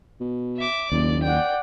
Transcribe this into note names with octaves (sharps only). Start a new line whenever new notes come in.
B2
E5 D6
F#1 D#2 D5
D5 F#5 G5